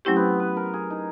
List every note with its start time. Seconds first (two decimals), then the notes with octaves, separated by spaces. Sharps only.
0.05 F#3 A3 C4 C#4 E4 G4
0.16 B3
0.40 B4
0.57 A#4
0.74 G#4
0.90 D#4